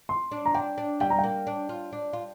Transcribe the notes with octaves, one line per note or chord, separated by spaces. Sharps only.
C6
D4
A#5
D4 G5
D4
G3 G5
A#5
G5
A#3
D4
F4
D4
F4